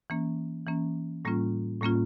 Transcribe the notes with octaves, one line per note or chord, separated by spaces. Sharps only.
E3 A#3 C#4
E3 A#3 C#4
A2 G3 A#3 C#4 F4
A2 G3 A#3 C#4 F4